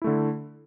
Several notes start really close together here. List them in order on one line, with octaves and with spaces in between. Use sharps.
E4 A3 D3